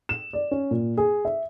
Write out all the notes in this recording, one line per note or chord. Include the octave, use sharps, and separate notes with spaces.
E7
D5
C#4
A#2
G#4
E5